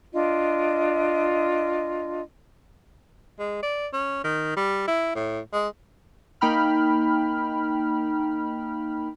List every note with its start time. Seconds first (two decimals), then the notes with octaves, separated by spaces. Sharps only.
0.13 D4 F4 D#5
3.39 G#3
3.62 D5
3.93 C#4
4.24 D#3
4.56 G3
4.87 E4
5.15 A2
5.53 G#3
6.41 A#3 D#4 G5 B5 F6